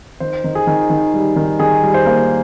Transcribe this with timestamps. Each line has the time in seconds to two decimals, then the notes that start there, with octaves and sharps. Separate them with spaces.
0.20 D#3 C5
0.44 D#3
0.55 G#4
0.67 D#3
0.90 D#3
1.14 G3
1.36 D#3
1.60 D#3 G#4
1.83 G3
1.94 C5
2.06 A#3